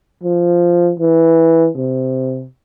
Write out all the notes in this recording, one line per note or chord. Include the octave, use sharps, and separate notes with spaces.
F3
E3
C3